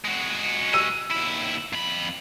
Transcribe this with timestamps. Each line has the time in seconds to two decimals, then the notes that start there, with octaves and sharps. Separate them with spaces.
0.04 G#3 F#4
0.73 E6 D#7
1.11 D#2 E4
1.73 F2 B5